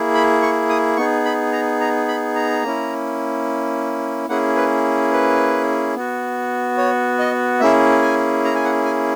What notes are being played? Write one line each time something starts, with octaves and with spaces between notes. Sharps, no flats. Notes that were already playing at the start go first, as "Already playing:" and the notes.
Already playing: A#3 E4 G#4
B5
C#6
D#6
B3 D#4 G#4 C#6
B5
A#5
A#5
B5
A#5
A#3 C#4 E4
A#3 C#4 E4 G#4 F#5
B4
B4
B3 F#4
C#5
D#5
A#3 C#4 E4 G#4 E5
G#5
A#5
G#5
F#5
G#5